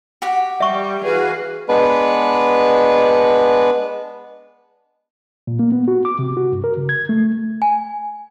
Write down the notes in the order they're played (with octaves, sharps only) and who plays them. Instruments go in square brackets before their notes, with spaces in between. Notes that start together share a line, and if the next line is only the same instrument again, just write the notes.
[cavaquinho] F#4 G4 F#5
[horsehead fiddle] G3 [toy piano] E5 C#6
[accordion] E3 F#4 B4 [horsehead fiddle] G#4 F5
[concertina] G#3 B3 D4 B4
[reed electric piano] A#2
A#3
B3
F#4
D6
C3
F#4
G2
A#4
C#3
G#6
A3
[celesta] G#5